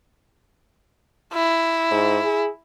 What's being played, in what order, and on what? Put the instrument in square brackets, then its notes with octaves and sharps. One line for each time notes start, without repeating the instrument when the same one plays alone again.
[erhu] E4
[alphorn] G#2
G#4